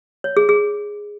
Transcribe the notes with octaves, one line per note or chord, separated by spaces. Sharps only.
C#5
G#4
G#4